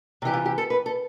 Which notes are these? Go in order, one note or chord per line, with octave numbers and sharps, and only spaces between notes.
C3 E3 G4
F4
G4
A4
B4
A4